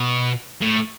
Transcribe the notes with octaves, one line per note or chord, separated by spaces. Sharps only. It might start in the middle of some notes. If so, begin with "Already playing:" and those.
Already playing: B2
A2